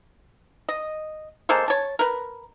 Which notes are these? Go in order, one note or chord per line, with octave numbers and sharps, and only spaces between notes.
D#5
G#3 A#3 A4 C5
C#5 A5
A#4 B4